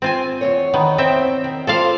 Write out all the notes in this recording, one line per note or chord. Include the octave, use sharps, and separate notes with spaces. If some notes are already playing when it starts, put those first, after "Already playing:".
C4 F4 G#5
E2 B2 C#5
D#3 B3
C4 E5 G5
D#3
F4 A4 C5 D5 F5